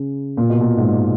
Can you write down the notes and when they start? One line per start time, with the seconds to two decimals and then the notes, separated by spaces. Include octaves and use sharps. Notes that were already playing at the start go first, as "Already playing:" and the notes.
Already playing: C#3
0.37 A#2
0.50 B2
0.61 A#2
0.77 G#2